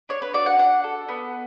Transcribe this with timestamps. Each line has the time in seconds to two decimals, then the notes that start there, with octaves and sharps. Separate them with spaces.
0.09 D4 C#5
0.22 B4
0.33 F#4 D5
0.46 F#5
0.58 D4 F#5
0.84 A4
1.08 B3